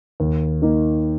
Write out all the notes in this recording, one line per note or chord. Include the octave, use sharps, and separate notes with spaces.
D#2
D#3 A#3 D#4